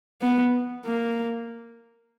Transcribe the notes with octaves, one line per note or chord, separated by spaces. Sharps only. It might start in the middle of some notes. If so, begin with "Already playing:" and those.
B3
A#3